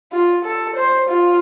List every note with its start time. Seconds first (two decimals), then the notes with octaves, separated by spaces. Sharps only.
0.12 F4
0.45 A4
0.76 C5
1.09 F4